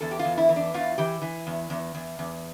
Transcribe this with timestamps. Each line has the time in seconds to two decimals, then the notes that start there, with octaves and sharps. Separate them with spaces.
0.01 E2 A4
0.11 G4
0.19 F4
0.25 E2
0.37 E4
0.49 E3
0.56 D4
0.74 E2 F4
0.98 E3 G4
1.22 E3
1.47 E2
1.70 E2
1.95 E2
2.19 E2